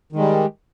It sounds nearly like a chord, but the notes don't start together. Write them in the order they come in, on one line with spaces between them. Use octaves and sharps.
D#3 G#3 G3